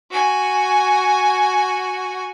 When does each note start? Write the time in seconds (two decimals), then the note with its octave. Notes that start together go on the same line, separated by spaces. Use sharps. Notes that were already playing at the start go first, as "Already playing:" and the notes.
0.11 F#4 G#5